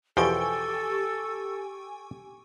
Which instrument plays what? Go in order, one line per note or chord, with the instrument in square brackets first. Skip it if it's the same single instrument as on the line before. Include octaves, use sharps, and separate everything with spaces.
[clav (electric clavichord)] E2 B2 F3 [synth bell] G4 G#5 C#6 [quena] A4